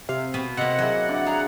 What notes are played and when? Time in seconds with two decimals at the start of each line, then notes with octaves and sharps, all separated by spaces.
0.09 C3 F5
0.34 B2 B3
0.57 C3 A#3 D#5 F#5
0.78 F#3 E4 G#4 D5
1.09 D3 D5
1.26 G#4 A#5